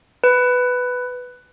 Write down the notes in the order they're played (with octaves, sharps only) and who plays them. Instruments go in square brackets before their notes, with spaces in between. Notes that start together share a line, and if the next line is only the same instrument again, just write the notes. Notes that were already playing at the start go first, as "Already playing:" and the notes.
[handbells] B4